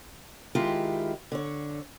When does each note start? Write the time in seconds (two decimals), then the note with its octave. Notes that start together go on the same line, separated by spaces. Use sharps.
0.55 D#3 G#3 E4 F4 G4
1.32 D3 C#5